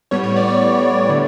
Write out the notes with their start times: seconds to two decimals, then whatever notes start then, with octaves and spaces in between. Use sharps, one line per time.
0.11 A2 G3 B3 C#5
0.24 C#5
0.36 D5
0.48 C#5
1.09 D3 A3